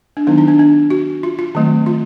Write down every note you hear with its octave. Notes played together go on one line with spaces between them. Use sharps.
D4
D#3 F#3 B3 D4 D#4
D#4
D4
D4
F#4
F4
F4
D#3 F#3 A3 C4
F4